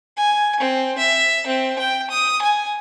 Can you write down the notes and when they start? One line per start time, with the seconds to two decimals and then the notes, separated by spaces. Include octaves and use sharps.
0.17 G#5
0.60 C4
0.98 E5
1.47 C4
1.79 G5
2.10 D#6
2.42 G#5